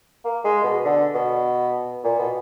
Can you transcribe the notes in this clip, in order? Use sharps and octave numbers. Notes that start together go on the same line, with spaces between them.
A#3
G#3
B2
D3
B2
A#2
B2